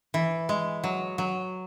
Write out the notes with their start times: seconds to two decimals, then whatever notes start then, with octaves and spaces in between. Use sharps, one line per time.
0.14 E3
0.49 G#3
0.84 F#3
1.18 F#3